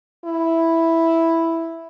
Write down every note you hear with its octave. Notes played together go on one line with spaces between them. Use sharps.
E4